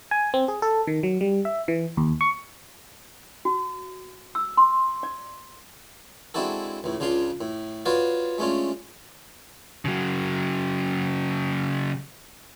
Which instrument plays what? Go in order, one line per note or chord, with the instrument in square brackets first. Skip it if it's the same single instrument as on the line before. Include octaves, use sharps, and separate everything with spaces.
[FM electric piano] G#5
C4
G#4
A4
D#3
F#3
G3
E5
E3
D#2
C#6
[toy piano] F#4
E6
C6
D5
[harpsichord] G#3 C4 D4 E4 F#4 A4
C#2 A2
C#2 C#3 D4 F4 C6
A2
F4 F#4 B4 C#5 D5 F5
G#3 A3 C#4 D4 F4
[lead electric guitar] C#3 F#3